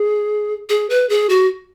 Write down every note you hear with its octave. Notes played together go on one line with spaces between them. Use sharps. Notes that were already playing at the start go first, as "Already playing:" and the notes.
Already playing: G#4
G#4
B4
G#4
F#4